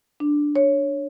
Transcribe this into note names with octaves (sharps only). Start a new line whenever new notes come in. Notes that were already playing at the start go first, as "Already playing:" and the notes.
D4
C#5